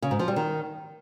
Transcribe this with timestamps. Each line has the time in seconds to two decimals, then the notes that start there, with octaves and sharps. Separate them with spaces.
0.02 C#3
0.11 G#2
0.19 F3
0.28 G3
0.36 D#3